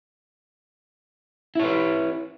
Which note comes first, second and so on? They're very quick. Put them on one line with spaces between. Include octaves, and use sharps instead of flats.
E4 C#5 B4